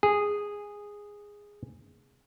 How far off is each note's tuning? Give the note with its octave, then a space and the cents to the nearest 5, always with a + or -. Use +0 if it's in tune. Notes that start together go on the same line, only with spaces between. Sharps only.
G#4 -10